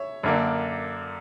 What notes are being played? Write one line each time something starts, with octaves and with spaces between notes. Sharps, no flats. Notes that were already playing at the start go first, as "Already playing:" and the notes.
Already playing: C#5 E5
F#2 D3 A#3 D4